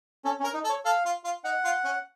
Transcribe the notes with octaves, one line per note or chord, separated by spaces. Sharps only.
C#4 A4
C#4
A#4
D#4
A4
C#5
A4 F5
F4
F4
D#4 F#5
F4
C#4